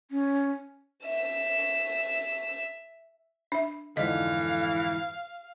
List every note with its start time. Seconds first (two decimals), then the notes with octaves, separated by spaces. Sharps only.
0.11 C#4
1.04 E5 E6
3.52 D4 E5
3.97 F2 G#2 D3 E3 D#5 F5